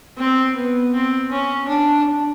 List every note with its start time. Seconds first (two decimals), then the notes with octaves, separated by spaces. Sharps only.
0.18 C4
0.55 B3
0.93 C4
1.31 C#4
1.68 D4